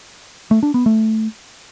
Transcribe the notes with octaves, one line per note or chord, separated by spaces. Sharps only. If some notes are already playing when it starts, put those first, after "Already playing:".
A3
D4
B3
A3